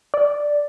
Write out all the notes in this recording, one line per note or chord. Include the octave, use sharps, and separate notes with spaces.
D5